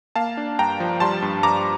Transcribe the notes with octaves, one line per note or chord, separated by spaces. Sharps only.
A#3 F5 A5
D4
G2 G5 A#5
F3
G3 A5 C6
G2
G2 A#5 D6